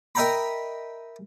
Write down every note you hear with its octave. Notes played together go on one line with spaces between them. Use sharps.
A#4 D#5 E5 G5 A#5 B5